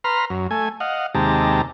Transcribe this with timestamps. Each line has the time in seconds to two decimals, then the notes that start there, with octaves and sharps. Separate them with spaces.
0.04 B4 A#5 C6 F6
0.30 F#2
0.51 A3 G#5
0.80 D#5 F5 F#5
1.15 D#2 C3 G#3 G4 A5 A#5